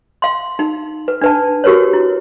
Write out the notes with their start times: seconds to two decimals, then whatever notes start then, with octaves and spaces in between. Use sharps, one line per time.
0.22 F5 C6
0.59 D#4
1.08 B4
1.21 D4 B4 A5
1.64 F#4 G4 A#4 B4 C#5
1.93 E4